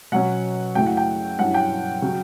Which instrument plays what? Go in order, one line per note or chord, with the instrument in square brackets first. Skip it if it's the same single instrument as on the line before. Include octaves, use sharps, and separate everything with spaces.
[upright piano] B2 F#3 C#4 F#5
F#2 C#3 F#3 A3 E4 G5
F#5
G5
G2 F#3 C#4 E4 F#5
G5
C#3 F#3